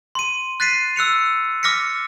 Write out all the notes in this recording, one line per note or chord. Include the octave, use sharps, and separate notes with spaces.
C6 D#7
F#6 A6 B6 C7 D#7
E6 F#6 C#7 F7
D6 F6 A#6 B6 C#7